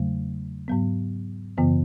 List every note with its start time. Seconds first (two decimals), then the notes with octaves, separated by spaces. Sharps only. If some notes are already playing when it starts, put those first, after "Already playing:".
Already playing: E2 C#3 F#3 A3
0.68 G#2 F#3 B3
1.57 F#2 C#3 E3 B3